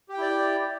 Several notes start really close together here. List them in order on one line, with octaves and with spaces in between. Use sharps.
G4 G5 E4 D5